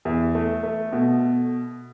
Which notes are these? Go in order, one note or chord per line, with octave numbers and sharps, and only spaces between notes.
E2
A3
A3
B2